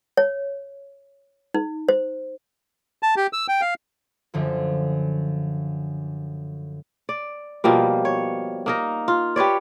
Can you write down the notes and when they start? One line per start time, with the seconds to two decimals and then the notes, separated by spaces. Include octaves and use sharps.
0.17 C#5
1.54 D#4
1.89 C5
3.03 A5
3.17 G4
3.33 E6
3.48 G5
3.61 F5
4.34 F#2 D3 F3
7.09 D5
7.64 B2 F3 G3 A#3
8.05 C#5
8.66 A#3 D#4 A#4
9.08 F4
9.36 G4 B4 C#5 D5